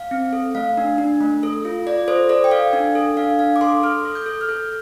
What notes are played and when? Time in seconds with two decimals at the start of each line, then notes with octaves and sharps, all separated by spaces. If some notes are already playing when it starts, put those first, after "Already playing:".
Already playing: F5
0.11 C4
0.33 A4
0.55 A3 F5
0.77 D4
0.98 D4
1.21 A3
1.43 A4
1.65 F4
1.87 F4 D5
2.08 A4 C5
2.29 A4 D5
2.44 G5
2.51 A4 F5
2.73 D4
2.95 A4
3.17 D4 F5
3.39 D4 F5
3.56 D6
3.61 A4 C6
3.83 A4 F6
4.05 A4
4.15 G6
4.26 A4
4.41 F6
4.49 A4 G6